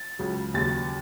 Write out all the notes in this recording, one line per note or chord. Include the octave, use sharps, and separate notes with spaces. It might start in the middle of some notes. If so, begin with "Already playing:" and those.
Already playing: A6
C#2 C#3 F#3
D#2 C#3 F#3 A6